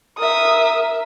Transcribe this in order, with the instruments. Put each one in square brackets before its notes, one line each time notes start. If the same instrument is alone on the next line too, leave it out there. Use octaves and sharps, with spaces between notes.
[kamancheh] A#4 E5 [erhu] D#6